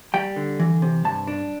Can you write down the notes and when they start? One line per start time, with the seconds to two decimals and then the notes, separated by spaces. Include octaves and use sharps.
0.14 G3 G5
0.36 D3
0.60 E3
0.82 C3
1.05 G2 A5
1.27 D4